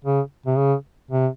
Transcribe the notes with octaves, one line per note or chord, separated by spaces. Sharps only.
C#3
C3
C#3
C3